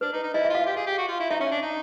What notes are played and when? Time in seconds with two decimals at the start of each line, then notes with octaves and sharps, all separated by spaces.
0.01 D4 B4
0.13 D#4
0.23 D#4
0.34 E4 D#5
0.45 E5
0.50 F4 F5
0.66 G4
0.76 G#4
0.87 G4
0.98 F#4
1.08 F4
1.20 E4
1.30 D#4 E5
1.40 C#4
1.51 D4
1.62 D#4